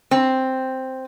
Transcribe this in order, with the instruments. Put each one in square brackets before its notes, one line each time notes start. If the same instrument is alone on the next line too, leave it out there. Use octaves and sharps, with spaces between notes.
[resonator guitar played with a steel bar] C4